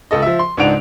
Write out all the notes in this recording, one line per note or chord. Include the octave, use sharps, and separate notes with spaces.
C#2 A4 D#5
F3 E5
C6
C#2 G#2 D4 F#5 D7 F7